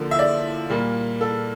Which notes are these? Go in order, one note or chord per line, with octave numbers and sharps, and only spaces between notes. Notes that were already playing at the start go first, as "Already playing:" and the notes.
Already playing: D3 F3 A#3
E5
D5
A#2 G3 A#3
A4